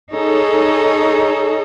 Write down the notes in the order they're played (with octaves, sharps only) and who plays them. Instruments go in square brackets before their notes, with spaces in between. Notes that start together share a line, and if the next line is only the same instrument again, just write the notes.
[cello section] D#4 G#4 A4 C#5